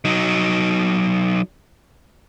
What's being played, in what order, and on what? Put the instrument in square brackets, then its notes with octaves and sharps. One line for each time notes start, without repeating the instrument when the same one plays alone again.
[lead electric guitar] F#3 D#4